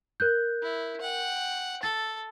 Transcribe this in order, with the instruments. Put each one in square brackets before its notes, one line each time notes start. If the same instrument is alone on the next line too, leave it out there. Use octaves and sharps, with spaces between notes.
[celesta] A#4 F#6 G6
[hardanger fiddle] E4
F#5 G5
[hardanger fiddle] A4 [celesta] A6